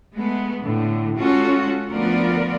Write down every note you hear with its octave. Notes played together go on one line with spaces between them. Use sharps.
G#3 A3 B3
A2 D3
G#3 C#4 F4 F#4 A4
D2 F3 B3 F4 A#4 D5